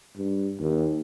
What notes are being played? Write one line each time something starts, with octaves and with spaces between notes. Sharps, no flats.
G2
D#2